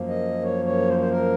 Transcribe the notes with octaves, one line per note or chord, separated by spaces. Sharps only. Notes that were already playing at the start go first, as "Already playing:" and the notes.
Already playing: F#2 F3 A#3
D#5
C#5
C#5
C5
C5
A#4